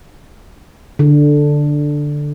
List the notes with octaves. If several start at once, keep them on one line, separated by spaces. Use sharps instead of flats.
D3